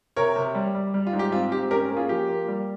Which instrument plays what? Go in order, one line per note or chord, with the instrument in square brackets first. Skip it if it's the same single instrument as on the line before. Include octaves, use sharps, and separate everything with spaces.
[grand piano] C3 A#4 C#5
C3
G3
G3
G3
F4
G#2
G4
C4 F4
G#2 G4
C#4 G4 A#4
A#3
F4 G#4
F3 G4
A#3
G3